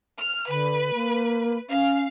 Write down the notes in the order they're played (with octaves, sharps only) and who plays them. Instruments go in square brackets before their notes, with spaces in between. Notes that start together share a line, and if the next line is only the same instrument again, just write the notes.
[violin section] F6
[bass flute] D3 [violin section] B4
[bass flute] A#3
[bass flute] C#4 [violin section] F5